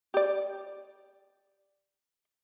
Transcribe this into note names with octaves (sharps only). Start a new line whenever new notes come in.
G4 D5